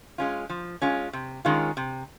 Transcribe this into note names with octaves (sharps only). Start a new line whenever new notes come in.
G#3 C#4 F4
F3
G#3 C#4 F4
C3
D#3 G#3 C#4 F4
C3